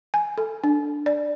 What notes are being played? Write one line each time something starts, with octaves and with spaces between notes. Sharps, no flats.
G#5
A4
D4
D5